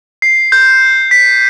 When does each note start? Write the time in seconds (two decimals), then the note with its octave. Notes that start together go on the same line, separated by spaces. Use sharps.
0.22 C7
0.52 G6
1.11 B6